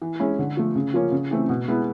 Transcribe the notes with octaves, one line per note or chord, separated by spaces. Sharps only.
E3
G#3 C#4 E4
D3
F3 A3
C#3
F3 A#3 C#4 F4
C#3
E3 A3 C4
B2
G#3 B3 E4